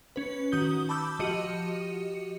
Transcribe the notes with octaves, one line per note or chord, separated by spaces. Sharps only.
C#4 B4
D#3 F#4 D#6 G6 G7
A5 B5 D6 E6 G6
F3 F#4 G4 D#5 C#7 D#7